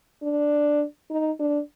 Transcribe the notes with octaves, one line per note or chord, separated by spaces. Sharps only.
D4
D#4
D4